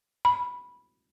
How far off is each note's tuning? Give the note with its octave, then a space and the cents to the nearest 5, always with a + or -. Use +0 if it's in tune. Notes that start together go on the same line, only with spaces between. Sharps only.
B5 -10